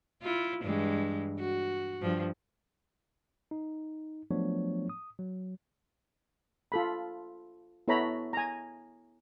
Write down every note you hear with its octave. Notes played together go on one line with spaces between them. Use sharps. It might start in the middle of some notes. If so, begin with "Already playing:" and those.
E4 F4
G2 E3 G#3
F#4
G2 F3
D#4
F3 F#3 A3 B3 D4 C#5
D#6
F#3
F4 A4 B5
B3 E4 A4 C#5 A#5 B5
G#5 A#5